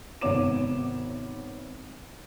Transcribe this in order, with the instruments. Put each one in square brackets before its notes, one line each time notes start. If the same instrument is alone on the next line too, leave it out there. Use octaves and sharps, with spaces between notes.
[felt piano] G#1 C3 B3 C#5 D6 E7